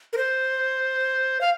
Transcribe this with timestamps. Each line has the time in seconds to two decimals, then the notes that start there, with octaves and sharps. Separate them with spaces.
0.13 A#4
0.17 C5
1.41 F5